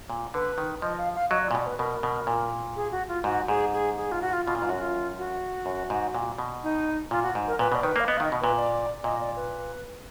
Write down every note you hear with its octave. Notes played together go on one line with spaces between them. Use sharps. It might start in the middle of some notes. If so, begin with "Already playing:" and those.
A#2
D3 B4
D#3
F3 D#5
F5
F5
F#3 D#5
D5
A#2
B2 D5
B4
B2 A#4
B2
A#2
G#4
F#4
F4
G#2 F#4
G#2 G#4
G#4
G#4
F4
F#4
F4
B2 F4
A#2
G#2 F4
F#2 F#4
F4
F#4
F#2
G#2
A#2
B2
D#4
A#2 F4
F#4
G#2
A#4
A#2 B4
B2 D5
D#3 B4
A#3
F5
B3 D#5
D#3 F5
D#5
B2
A#2 B4
D5
A#2 D#5
D5
B4